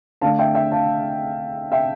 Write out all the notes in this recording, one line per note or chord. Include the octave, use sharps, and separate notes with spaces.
D3 A3 D4 F5 A5
E5 G5
E5 G5
F5 A5
E5 G5